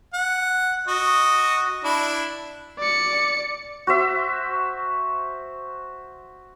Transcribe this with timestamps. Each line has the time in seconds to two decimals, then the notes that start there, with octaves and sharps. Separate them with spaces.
0.14 F#5
0.87 F#4 D#5
1.84 D4 E4
2.79 D5 C#7
3.87 F#4 C5 E5